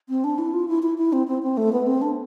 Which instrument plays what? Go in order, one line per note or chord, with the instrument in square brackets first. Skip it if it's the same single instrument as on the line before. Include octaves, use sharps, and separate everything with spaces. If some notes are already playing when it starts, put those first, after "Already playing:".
[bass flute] C4
D4
E4
F4
E4
E4
E4
C4
C4
C4
A3
B3
C4
D4